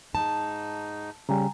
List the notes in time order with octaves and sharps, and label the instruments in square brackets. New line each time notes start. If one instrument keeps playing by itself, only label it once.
[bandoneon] G#2 D#4 [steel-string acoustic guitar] A5
[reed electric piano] C#3 G3 [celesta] G5 G#5 A#5